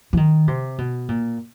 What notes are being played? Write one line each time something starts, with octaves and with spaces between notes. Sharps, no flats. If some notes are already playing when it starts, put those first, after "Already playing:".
E3
D#3
C3
B2
A#2